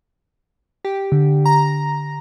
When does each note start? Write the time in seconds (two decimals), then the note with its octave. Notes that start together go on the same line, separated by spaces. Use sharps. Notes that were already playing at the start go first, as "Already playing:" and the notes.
0.85 G4
1.12 D3
1.46 A#5